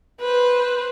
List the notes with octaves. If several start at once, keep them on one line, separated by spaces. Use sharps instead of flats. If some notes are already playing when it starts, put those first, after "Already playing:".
B4 C5